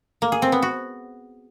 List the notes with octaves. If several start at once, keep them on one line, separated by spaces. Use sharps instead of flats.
A#3
G#4
C4
B3
F#4